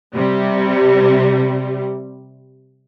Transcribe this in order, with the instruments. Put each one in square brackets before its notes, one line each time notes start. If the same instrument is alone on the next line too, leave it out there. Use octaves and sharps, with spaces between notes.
[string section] C3 G3